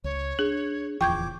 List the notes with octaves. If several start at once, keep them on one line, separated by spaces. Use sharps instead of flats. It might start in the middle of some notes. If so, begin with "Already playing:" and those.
C#2 C#5
D4 G#4
D1 E2 F3 G5 C#6 D6 G6 G#6